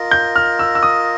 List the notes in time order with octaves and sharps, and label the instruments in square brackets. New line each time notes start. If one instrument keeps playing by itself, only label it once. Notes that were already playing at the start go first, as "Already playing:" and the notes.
Already playing: [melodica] F4 A#4 D#5
[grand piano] G6
F6
E6
E6
D#6